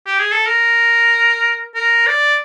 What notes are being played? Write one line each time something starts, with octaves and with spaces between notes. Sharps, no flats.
G4
G#4
A4
A#4
A#4
D5